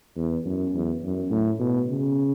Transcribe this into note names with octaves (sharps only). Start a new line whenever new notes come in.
E2
F#2
E2
F#2
A2
B2
C#3